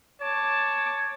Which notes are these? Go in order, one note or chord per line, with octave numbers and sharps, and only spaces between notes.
C#5 A5 D6